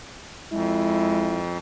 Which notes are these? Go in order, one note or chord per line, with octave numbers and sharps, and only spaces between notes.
F2 G#3 E4